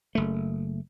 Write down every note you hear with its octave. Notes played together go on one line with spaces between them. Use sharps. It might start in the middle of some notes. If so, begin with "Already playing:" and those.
F#1 A3